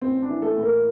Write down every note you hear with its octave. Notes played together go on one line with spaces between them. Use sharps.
A1 C4
D4
E3
A3 A4
A2
A#3 A#4